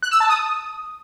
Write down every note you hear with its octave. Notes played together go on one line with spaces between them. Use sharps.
F#6
E6
A5
D#6